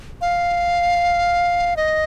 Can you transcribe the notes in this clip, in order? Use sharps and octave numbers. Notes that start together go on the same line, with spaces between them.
F5
D#5